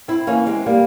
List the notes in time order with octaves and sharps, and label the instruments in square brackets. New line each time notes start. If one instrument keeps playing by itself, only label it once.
[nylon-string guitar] C4 E4
E3 A#3 C#4
G#3 C4
G3 A#3